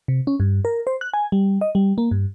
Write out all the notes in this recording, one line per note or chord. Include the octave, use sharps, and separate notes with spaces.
C3
C#4
G2
A#4
C5
F#6
G#5
G3
D#5
G3
A#3
G2